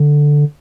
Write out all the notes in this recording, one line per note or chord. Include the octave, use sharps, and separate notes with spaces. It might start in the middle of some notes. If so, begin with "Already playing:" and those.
Already playing: D3